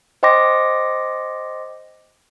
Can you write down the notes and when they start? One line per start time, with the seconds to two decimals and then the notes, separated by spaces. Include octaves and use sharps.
0.23 C5 D#5 G5 C6 D6 A#6